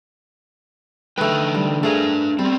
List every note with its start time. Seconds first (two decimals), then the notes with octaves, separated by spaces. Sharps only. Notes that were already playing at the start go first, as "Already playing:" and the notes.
1.18 D3 A3 D#4 B4 G5
1.55 G3
1.83 A3 D4 G#4 A#4 B4
2.39 G3 C4 C#4